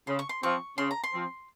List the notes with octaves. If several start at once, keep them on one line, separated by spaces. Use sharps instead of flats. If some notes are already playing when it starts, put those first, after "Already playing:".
C#3 C6
C#6
C6
F3 C4 C#6
C#3 C6
A#5
C6
F3 C4